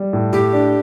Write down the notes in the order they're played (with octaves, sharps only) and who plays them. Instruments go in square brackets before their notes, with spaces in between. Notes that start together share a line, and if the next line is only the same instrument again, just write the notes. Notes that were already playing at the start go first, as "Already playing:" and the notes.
Already playing: [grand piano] G3
A2
[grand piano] A2 [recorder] G4
[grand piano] D4